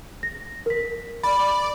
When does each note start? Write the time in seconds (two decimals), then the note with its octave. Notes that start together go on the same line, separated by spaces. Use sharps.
0.23 A#6
0.66 A#4 B6
1.23 D5 B5